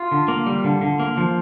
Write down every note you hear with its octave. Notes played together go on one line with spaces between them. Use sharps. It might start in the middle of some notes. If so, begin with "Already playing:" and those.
Already playing: F4
D3
A#3
G3
D3
D3
A#3
F3